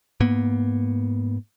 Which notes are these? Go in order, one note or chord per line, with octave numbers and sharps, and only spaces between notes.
G#2 A#3 B3